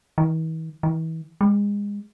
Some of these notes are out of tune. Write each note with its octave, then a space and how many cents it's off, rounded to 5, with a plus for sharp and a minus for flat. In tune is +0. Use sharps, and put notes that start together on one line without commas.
E3 -45
E3 -35
G#3 -30